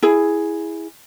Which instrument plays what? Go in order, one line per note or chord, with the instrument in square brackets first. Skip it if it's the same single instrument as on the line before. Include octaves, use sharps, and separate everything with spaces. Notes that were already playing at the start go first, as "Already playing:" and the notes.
[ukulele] E4 G#4